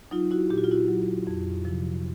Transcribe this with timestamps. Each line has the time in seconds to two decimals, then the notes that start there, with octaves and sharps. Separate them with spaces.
0.11 F#3 D#4 F4
0.31 E4 F#4
0.50 A#2 G4
0.58 F#4
0.64 F4
0.71 E4 F#4
0.88 F#3
1.27 F2
1.65 C3 F3